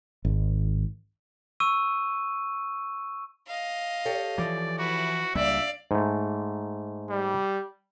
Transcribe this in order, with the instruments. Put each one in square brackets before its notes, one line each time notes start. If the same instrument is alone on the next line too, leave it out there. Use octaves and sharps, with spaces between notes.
[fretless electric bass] G#1
[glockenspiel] C#6 E6 D#7
[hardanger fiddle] D#5 F5
[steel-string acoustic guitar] G4 A4 C#5
[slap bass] E3 F3 [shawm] D5
[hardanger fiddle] E4 B4 [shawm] F#4
[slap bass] C#2 G3 A#3 [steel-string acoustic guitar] D4 [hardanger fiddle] D5 F5 [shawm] E5
[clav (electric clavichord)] G#2 A3
[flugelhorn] G3